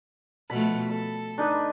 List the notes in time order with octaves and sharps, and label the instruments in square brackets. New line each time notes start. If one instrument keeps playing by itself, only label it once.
[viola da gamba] B2 F3 A3 [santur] B5
[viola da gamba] A4 [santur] B5
[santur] D4 D#4 B4